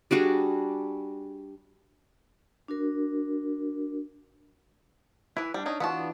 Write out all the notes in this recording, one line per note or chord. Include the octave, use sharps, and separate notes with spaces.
G3 D4 F#4 G#4
D4 F#4 A#4
E3 E4 B4
G3 D4
C#4 D#4
E3 B3 D4 F4 F#4 E5 A5